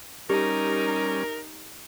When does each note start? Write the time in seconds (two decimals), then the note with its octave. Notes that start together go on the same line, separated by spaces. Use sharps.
0.30 G3 C#4 D#4 G4 A#4